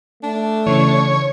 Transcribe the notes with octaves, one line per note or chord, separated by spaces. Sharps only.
A3 D4
C#3 E3 C#5